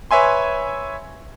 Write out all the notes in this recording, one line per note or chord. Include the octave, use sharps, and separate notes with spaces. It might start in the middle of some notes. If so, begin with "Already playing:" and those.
B4 C#5 E5 G#5 C6